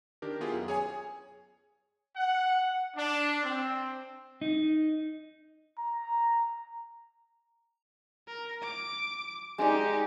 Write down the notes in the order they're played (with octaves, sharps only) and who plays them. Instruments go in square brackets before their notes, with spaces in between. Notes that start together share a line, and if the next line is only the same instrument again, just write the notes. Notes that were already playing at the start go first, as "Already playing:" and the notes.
[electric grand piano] D#3 D4 G4 A#4
B3 E4 F4 G4 G#4
F#2
G#4 C#5 G#5
[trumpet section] F#5
D4
C4
[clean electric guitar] D#4
[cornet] A#5
[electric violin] A#4
D6
[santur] G#3 D5 [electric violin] D#4 G4